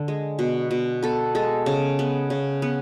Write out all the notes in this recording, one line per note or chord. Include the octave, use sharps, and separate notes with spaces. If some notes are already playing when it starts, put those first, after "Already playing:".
Already playing: D3
G#3
B2
B2
B3 A4
G#3 A4
C#3
B3
C#3
B3